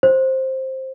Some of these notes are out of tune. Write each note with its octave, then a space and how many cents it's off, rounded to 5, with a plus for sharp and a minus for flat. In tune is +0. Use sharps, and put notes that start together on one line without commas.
C5 +10